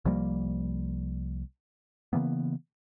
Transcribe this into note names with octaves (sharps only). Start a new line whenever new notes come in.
C2 F3 G3 A#3
C#3 E3 A#3 B3